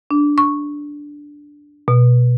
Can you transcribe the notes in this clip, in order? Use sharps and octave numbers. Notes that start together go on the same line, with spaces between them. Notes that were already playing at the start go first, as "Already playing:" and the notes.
D4
C#6
B2